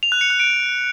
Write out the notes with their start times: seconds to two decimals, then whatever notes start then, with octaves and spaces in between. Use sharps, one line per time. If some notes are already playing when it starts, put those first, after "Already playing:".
0.03 F7
0.12 F#6
0.21 C#7
0.30 F#6
0.40 D7